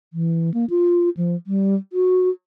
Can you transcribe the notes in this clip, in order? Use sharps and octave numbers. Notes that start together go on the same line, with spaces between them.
E3
A#3
F4
F3
G3
F#4